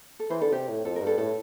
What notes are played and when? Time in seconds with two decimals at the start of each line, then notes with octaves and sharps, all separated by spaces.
0.20 A4
0.30 E3 C5
0.42 D3 A4
0.52 C3 G4
0.69 A2
0.85 F2 A4
0.96 A#4
1.01 G2
1.07 A4
1.18 A2 A4